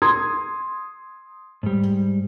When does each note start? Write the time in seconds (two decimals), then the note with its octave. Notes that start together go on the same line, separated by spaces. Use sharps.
0.02 C6 D#6 G#6
1.63 G#2 G3